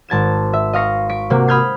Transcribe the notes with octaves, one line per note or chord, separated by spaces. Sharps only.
G#1 A5 G#6 E7
E5
D#5 F5 C#6 A#6 C7 C#7
C#6 B6 D7
C3 A#3 F#4
B5 D#6 F6 G6 G#6 C7